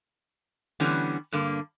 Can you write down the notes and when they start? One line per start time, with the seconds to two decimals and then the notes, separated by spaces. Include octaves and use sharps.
0.80 D3 E3 G3 B3 C#4
1.32 G2 D3 A#3